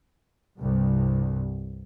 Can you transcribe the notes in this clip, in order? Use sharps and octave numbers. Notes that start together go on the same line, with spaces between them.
C2 G2